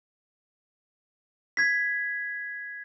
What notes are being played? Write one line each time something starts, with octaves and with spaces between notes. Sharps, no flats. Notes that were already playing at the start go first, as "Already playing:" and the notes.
G#6 B6